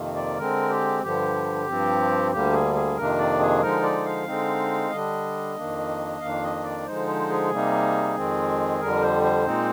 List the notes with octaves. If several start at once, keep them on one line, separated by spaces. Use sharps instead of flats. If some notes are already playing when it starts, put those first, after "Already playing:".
Already playing: F2 C3 D#3 A#3
D5
D3 G#3 C4 A#4
G4
G2 D3 F3 G4
G2 F3 C4
D2 D3 G3 A#3 G4
G#4
G#4
F2 C3 D#3 A#3 D4 A#4
D5
G#4
D3 F3 G#3 D#4 A#4
D5
F5
D3 G#3 C4 D#4
D3 G3 D4 D#5
F2 D#3 A#3 D4
F2 D#3 A#3 D4 F5
D#5
D5
D3 F3 G#3 D#4 C5
C5
G#4
C3 G3 A#3 D#4
F2 D#3 G#3 C4
F2 D3 G3 A#4
C5
C5
A#2 G#3 C4 D#4